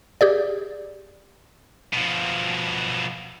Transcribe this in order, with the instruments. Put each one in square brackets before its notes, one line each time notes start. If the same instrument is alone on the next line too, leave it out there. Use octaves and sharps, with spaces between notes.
[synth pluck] G4 G#4 D5
[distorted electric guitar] B2 F3